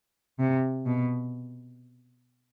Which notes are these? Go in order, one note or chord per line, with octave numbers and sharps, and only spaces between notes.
C3
B2